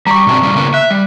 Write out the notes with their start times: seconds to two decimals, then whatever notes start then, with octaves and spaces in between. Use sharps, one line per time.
0.07 G3 A#5 C#6
0.27 B2 C4 D4
0.42 C#3 G3 C#4
0.56 C#3 A#3 B3
0.74 E5 F#6
0.91 G3